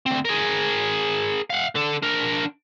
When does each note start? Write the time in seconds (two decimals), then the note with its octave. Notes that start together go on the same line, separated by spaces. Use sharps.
0.06 D2 C4
0.25 G#4 A#4
1.50 F5 F#5
1.75 D3 A4
2.03 D4 A#4